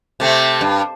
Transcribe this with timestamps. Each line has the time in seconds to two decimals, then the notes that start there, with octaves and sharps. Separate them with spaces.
0.20 C3 A3 C4
0.61 G2